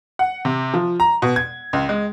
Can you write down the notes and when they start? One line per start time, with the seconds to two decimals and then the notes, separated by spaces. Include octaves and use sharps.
0.19 F#5
0.45 C3
0.74 F3
1.00 A#5
1.22 B2
1.36 G#6
1.73 C#2
1.89 G#3